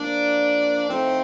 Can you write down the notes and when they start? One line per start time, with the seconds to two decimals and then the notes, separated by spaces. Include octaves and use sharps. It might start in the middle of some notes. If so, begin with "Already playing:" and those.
Already playing: F3 A#3 D4
0.86 A2 F3 A3 C4 D#4